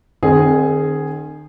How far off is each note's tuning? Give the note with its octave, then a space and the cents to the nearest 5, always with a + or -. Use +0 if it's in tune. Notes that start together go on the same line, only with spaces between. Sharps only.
D#3 -40 C4 +10 G#4 +0